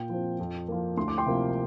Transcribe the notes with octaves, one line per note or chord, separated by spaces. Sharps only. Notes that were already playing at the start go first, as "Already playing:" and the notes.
Already playing: A#2 G5
F3 C4
F2
F3 A#3
D2 C6
D6
G5 C6
C3 F3 A#3